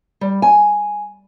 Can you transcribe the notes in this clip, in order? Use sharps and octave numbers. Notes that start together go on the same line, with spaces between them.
G3
G#5